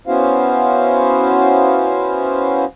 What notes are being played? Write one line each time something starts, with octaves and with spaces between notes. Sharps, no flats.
B3 C#4 E4 F#4 C5 F5